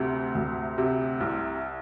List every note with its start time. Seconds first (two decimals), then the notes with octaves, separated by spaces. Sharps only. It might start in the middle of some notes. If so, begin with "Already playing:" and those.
Already playing: D2 C3
0.35 D2
0.78 C3
1.21 C2